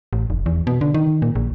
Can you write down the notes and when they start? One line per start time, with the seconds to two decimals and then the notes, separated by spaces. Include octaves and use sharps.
0.13 A1
0.30 F1
0.46 E2
0.67 B2
0.81 D3
0.94 D#3
1.22 A#2
1.35 A#1